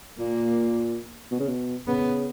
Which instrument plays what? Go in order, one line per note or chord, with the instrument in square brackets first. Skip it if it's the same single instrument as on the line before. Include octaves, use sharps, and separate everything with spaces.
[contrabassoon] A#2 [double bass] A#3
[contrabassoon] B2
C#3
B2
[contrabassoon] C#3 [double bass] B3